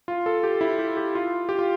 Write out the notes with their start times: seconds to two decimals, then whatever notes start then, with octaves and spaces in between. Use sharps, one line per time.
0.08 F4
0.26 A4
0.43 G4
0.61 E4
0.79 G4
0.97 G4
1.15 F4
1.49 G4
1.59 F4